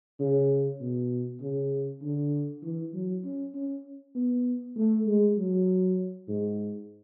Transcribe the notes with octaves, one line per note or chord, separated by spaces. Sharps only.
C#3
B2
C#3
D3
E3
F#3
C#4
C#4
B3
A3
G#3
F#3
G#2